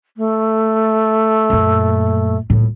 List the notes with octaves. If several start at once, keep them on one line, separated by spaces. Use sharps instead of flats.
A3
F#2 A#2
D#1 A2